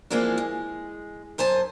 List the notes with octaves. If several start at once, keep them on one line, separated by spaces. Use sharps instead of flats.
E3 F3 G#3 A#3 C4 D4
G#3
F#2 C5 G#5 A5